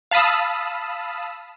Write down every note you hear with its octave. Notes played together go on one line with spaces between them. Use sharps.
F5 A5 B5 D#6 E6